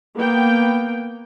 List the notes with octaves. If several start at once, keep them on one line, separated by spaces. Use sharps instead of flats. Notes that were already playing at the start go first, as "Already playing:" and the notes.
A#3 B3 G5